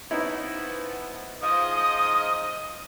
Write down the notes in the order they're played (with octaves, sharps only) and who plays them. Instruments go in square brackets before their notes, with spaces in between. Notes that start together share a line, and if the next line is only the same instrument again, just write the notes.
[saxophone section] E3 F3 B3 [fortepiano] C#4 D#4 E4
[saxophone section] G#2 F3 [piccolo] D#5 [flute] D#6